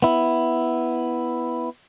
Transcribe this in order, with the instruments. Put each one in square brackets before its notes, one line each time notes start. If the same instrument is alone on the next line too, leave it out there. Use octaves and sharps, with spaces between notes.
[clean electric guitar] B3 E4